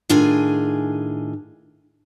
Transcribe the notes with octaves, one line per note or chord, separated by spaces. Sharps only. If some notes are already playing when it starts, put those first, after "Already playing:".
A2 D#3 D4 F4 G#4 G#5